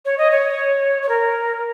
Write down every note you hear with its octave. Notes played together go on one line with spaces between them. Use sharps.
C#5
D#5
C#5
C#5
A#4